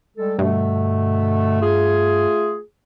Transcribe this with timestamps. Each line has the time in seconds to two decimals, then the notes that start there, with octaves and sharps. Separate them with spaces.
0.17 G3 G#3 A4
0.39 G2 B2 D3 A3
1.61 A3 F4 G#4